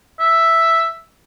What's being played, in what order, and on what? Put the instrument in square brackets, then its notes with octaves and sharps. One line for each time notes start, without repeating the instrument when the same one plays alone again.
[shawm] E5